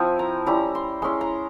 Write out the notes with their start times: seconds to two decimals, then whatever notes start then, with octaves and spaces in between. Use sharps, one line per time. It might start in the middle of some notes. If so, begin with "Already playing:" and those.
Already playing: F3 C4 E4 G#5
0.19 A#5
0.46 G3 C#4 E4 A#5
0.75 C6
1.02 G#3 C#4 E4 C6
1.21 A#5